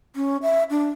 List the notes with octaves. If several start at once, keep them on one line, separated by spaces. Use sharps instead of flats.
C#4
E5
D4